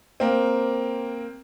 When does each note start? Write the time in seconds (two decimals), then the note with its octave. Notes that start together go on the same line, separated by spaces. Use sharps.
0.20 A#3 C4